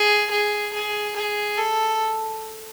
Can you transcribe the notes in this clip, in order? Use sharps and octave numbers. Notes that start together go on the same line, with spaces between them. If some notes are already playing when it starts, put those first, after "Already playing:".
Already playing: G#4
G#4
G#4
G#4
A4